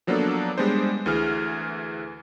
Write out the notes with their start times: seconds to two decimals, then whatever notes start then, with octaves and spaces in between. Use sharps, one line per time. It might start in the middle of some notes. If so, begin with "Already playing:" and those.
0.07 F3 F#3 A#3 B3 D4 A4
0.58 G3 G#3 B3 D4 C5
1.06 D2 E3 G#4 F6